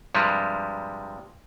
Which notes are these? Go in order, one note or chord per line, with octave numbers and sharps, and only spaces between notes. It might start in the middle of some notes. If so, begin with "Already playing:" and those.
G2 C3 F3 G3 G#3